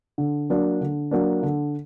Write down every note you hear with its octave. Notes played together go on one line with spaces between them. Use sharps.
D3
F#3 A#3 D4
D3
F#3 A#3 D4
D3